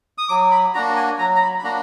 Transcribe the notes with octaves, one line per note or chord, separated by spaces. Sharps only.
D#6
F#3 D6
B5
A#3 D4 F#4 A#5
G#5
F#3 A#5
A#5
B5
B5
A#3 D4 F#4 A#5